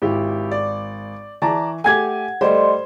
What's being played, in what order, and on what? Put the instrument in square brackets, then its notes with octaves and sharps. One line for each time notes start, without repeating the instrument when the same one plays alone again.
[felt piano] G#1 [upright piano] E4 G4
[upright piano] D5
[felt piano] E3 [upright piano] D5 A5 A#5 [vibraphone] C#6
[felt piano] A3 G4 [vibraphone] F#5 [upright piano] G#5 G#6
[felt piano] G3 A3 [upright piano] C5 [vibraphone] D5 D#5 C6